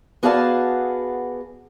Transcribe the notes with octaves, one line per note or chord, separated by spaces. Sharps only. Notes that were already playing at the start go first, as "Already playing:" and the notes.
B3 F#4 G#4 D5 F5 A5